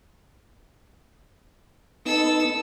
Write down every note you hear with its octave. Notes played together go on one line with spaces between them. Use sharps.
B3 D#4 A4 E6